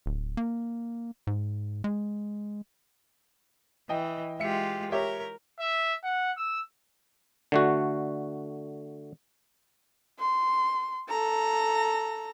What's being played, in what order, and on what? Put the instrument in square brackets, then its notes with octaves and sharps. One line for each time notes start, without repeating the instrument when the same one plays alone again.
[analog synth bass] D1
A#3
G#2
G#3
[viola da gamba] E3 [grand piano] D#5 G5
[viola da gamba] G#3 F4 G4 [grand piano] E5 C#7
[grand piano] G4 C#5 E5 [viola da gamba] A#4
[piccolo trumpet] E5
F#5
E6
[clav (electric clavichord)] D3 A3 F#4
[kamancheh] C6
A4 A#5